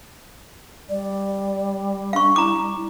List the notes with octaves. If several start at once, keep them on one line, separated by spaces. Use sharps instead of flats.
G3 D5
D4 F5 C#6
E4 A#5 D6